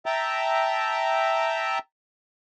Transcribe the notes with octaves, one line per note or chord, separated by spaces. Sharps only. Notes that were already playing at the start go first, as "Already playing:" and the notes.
E5 G5 A5 A#5